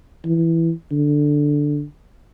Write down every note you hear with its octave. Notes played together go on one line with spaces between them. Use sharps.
E3
D3